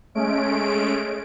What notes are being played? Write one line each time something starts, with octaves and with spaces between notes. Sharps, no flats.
G#3 A3 C#4 D7